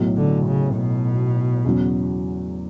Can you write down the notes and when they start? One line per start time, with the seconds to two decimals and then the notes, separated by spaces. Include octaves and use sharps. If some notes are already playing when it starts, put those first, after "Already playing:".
Already playing: B1 A2 F#3
0.17 D3
0.47 C#3
0.76 B2
1.65 E2 C#3 F#3